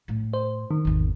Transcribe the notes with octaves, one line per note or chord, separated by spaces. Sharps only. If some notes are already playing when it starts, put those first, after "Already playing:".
A2
C5
D#3
G#1 E2